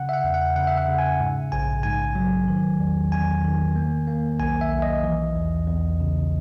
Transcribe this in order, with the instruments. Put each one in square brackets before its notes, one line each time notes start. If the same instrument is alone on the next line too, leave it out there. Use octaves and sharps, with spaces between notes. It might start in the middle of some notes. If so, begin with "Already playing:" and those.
Already playing: [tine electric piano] C#3 F#5
E5
F#5
E2
F#5
C#3 F#5
E5
F#5
C#3
G#5
G#2
A#1 G#5
G#2 G#5
F#3
D#3
E2
E2 G#5
D#3
A#3
A#3
B1 G#5
E5
B1
D#5
E3
E2
E2
C#3